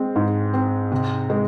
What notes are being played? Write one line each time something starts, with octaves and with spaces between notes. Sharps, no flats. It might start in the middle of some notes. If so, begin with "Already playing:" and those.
Already playing: G#3 C4
G#2
C4
C3
G#3